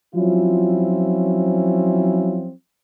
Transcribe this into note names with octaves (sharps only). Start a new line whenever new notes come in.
F3 F#3 C4 C#4 E4 F4